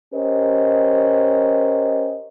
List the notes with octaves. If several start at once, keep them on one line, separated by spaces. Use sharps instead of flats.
C#4 G4 A#4 C5 D#5